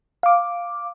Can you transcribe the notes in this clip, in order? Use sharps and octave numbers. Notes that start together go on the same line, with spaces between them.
F5 D6